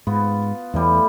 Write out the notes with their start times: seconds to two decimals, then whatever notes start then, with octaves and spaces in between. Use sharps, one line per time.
0.07 G#2 B3 F4
0.74 E2 A2 E3 G3